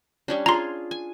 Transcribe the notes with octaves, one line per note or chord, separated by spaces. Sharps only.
G3 C#4 D4
F4 G#4 A#5 C6
G#5